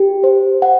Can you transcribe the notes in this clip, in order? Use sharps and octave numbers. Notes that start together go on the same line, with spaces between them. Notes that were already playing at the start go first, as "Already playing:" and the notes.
Already playing: G4
C5
F#5